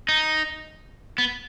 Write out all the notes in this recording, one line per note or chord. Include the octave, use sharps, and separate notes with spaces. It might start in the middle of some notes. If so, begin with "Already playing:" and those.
D#4
B3